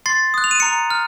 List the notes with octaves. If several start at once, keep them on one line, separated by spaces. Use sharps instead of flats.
C6 A6 C7
D#6 F#6
F7
D#7
A#5 C#7 F7
F6